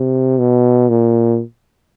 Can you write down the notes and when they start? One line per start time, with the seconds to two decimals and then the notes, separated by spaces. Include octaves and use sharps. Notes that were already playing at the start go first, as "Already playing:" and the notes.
Already playing: C3
0.40 B2
0.89 A#2